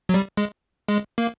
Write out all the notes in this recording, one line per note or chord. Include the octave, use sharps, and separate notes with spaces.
F#3
G3
G#3
G#3
A#3